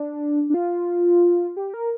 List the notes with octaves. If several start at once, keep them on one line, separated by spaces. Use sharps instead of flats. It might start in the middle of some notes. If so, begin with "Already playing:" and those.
Already playing: D4
D4
F4
G4
A#4